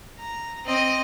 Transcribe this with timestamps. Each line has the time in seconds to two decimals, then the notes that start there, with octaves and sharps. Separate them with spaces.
0.18 A#5
0.65 C4 D#5